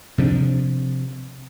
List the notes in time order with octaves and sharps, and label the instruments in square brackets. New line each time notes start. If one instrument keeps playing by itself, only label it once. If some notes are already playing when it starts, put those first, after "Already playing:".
[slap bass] C3 F3 C4 D4